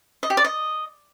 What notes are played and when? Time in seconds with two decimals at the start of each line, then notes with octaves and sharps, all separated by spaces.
0.23 D#5
0.30 G4
0.37 D5
0.44 D#5